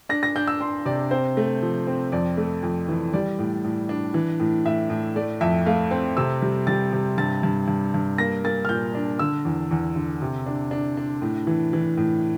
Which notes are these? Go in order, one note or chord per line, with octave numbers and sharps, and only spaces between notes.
D4 A#6
A#6
D4 G6
E6
D4 C6
C3 D5
C4 C5
A3
F3
C4
F2 D5
A3
F2
E3
G3 D5
A2
A2
D4
E3
A2
A2 E5
A2
A3 D5
F2 E5
A3 F5
C4
C3 E6
G3
G3 A6
C3
G2 A6
G2
G2
G2
A#3 A#6
A#3 A6
F6
A#2 G6
D4
D3 E6
E2
E2
D3
C3
D4
D4
D4
A2
E3
E3
A2